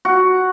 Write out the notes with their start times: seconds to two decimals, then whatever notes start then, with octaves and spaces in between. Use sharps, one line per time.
0.05 F#4